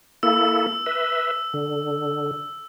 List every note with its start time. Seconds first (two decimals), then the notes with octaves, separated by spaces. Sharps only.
0.23 A#3 E4 A4 E6
0.86 B4 E5
1.54 D3